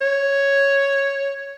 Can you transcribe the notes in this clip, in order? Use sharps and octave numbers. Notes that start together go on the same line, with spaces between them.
C#5